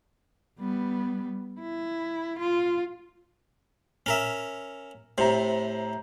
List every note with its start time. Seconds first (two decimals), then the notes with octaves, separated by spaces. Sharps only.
0.59 G3 B3
1.59 E4
2.39 F4
4.06 C#4 A#4 E5
5.18 A2 C3 C5 A#5